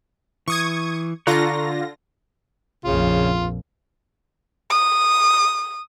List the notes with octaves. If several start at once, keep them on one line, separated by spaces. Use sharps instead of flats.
E3 C#6 D#6 G#6
D3 F4 A#5 C#6 F#6 A#6
A#1 F2 C#3 F4
D#6